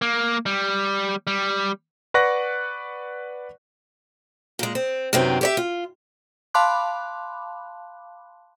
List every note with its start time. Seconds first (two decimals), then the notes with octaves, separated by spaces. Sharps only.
0.02 A#3
0.46 G3
1.27 G3
2.14 B4 D5 F#5 C#6 F#6 A#6
4.59 A#2 G#3
4.75 C4
5.13 F#2 C3 D#3 B3 C4
5.41 G4 C#5 E5
5.57 F4
6.54 F5 A5 B5 C6 D6 F#6